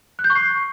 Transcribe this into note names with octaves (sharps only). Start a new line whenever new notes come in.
F#6
G6
C#6
C7